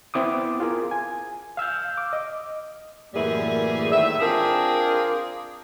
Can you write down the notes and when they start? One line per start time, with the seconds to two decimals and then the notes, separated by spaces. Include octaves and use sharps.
0.14 B3 C4 E4 D6 D#6
0.60 F4 G#4 A#4
0.91 G#5
1.57 F5 E6 F6 G6
1.98 D6
2.13 D#5
3.14 F#2 A2 E3 G3 A#3 G#4
3.92 A2 D#3 A3 E5
4.21 C4 D4 F4 G#4 A#4